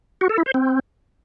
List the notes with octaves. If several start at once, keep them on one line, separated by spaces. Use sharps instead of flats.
F#4
A4
E4
C5
C4